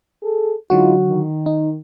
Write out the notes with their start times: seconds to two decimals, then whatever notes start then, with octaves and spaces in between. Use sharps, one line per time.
0.22 G#4 A4
0.70 D3 F#3 G#3 D#4 F4 F#4
1.07 D#3
1.46 D#4